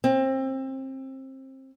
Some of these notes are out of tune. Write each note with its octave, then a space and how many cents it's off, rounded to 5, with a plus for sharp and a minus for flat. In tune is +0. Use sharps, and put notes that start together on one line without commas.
C4 +25